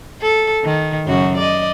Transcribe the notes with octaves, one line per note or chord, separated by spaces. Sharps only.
A4
D#3
F#2 C#3 F#4
D5 D#5